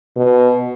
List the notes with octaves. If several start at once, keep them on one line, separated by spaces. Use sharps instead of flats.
B2